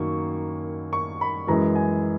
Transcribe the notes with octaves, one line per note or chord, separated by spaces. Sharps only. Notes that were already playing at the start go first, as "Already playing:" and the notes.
Already playing: F#2 D#3 F#3 A#3 C#6
C#6
B5
F#2 E3 G#3 A#5
G#5